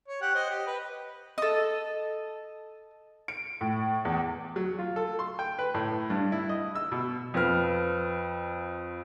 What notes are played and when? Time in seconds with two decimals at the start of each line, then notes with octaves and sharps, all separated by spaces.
0.08 C#5
0.21 G4 F#5
0.35 C5 D#5
0.50 G4 D#5
0.67 B4
1.38 A4 D#5
3.28 D7
3.61 A2
4.05 E2
4.56 F#3
4.79 F4
4.96 A4
5.19 C6
5.39 G5
5.59 B4
5.74 A2
6.10 G2
6.32 E4
6.49 D#5
6.75 E6
6.92 B2
7.34 F2 F3 B4 F6